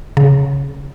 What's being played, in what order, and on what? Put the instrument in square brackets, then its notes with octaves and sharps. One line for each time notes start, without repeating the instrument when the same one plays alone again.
[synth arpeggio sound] C#3